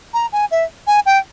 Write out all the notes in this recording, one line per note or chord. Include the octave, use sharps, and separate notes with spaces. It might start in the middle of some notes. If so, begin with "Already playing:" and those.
A#5
G#5
E5
G#5
G5